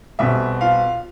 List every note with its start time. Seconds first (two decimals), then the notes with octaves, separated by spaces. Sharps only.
0.19 B1 B2 G3 C4 E5
0.61 F4 F5